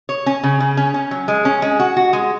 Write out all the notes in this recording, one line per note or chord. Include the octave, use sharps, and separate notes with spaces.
C#5
C#4
C#3
C#3
C#4
C#4
F#3
G#3
C#4
G#3
F#4
F#4
G#3